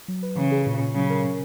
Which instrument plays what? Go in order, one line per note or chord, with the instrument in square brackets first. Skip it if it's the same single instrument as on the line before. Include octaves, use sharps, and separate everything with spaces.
[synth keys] F#3
B4
[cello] C#3 [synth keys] E3
[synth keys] G#4
A#2
A#2
[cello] C#3 [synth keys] F#3
[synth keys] A#4
C#3